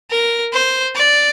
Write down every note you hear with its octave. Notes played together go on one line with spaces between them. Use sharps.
A#4
C5
D5